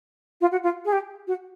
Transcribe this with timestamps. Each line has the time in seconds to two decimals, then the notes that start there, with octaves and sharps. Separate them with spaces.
0.41 F4
0.51 F#4
0.63 F4
0.85 G#4
0.92 G4
1.27 F#4